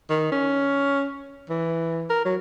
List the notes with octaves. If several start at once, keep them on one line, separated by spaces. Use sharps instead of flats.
D#3
C#4
E3
A#4
F#3